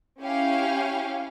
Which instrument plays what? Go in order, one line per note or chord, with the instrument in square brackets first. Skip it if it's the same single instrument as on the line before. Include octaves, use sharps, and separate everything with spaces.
[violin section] C#4 E4 G4 F5